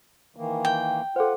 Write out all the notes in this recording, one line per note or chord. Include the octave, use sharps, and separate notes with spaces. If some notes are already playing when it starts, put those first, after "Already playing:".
D#3 E3 A#3
G5
F4 A4 C5 F#5